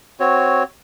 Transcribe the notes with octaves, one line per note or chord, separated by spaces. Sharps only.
C4 F#4 C#5